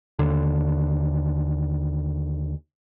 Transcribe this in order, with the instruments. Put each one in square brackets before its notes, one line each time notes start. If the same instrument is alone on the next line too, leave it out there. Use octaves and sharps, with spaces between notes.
[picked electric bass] D#2 D3